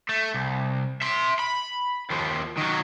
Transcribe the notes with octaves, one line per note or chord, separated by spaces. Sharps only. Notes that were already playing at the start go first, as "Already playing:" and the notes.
A3
C2
E5 C6
B5
D#2 F3
D#3 F#3